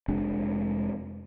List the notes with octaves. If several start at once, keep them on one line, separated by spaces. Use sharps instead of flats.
F1 G#3 D4